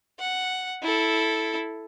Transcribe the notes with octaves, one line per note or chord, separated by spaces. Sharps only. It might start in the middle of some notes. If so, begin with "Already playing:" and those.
F#5
E4 A4